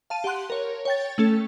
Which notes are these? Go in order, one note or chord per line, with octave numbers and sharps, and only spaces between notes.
F5 A5 D#7
G4 F#5 C6 F#6
A#4 C#5
C#5 G5 A6
A3 C#4 A4